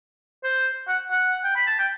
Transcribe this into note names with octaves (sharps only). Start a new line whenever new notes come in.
C5
F#5
F#5
G5
B5
A5
G5